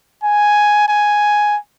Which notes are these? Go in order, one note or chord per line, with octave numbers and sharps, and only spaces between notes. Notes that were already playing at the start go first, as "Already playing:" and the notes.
G#5
G#5